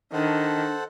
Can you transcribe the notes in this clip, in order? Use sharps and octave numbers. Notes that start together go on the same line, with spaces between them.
D#3 D4 A4 C5 F#5